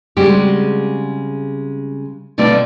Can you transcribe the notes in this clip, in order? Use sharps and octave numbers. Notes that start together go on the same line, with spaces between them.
C#3 G3 G#3 C4 F#4 G4
B2 D3 A3 C4 F4 D5